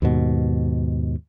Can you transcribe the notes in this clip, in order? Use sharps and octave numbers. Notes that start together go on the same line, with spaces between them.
D#2 G#2 B2